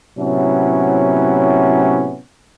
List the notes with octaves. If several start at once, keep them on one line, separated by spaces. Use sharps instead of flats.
A2 C3 F#3 B3 C#4 E4